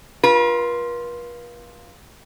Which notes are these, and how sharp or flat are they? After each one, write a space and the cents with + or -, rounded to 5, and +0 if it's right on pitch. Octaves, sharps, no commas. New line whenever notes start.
F4 +0 B4 -45